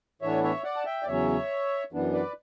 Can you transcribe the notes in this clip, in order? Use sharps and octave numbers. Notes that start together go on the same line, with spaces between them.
A2 E3 B3 D4 C#5 E5
C#5 E5
D5 F#5
A5
E5 G5
D5
E2 C#3 F#3 C#4 C#5 E5
F#2 E3 B3 D4
B4 D5